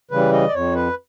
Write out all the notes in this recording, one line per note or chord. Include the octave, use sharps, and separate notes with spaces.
C#3 E3 G3 B4
D#5
D5
F2 C#5
B4